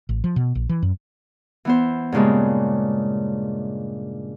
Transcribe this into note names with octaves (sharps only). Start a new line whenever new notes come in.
A1
F3
B2
A#1
E3
F#2
E3 B3 C5
G2 A#2 C#3 G#3 D4